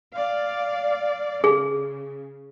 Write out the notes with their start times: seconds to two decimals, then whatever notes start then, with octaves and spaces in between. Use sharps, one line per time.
0.14 D5 F5
1.44 C#3 G#4